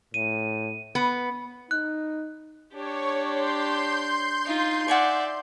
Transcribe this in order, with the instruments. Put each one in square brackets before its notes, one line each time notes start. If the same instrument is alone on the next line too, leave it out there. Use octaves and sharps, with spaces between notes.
[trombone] A2 [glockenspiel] D#7
[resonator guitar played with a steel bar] B3
[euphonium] D#4 [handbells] F#6
[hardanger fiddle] D4 G4 [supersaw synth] C#5
[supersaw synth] C6 G6
[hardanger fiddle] D#4 F4
[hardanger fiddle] D5 E5 [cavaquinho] F#5 G#5 C#6